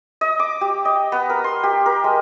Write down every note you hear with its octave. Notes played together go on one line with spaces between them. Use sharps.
D#5
D6
G4
D#5
B3
A#4
C6
G4
A#4
G#3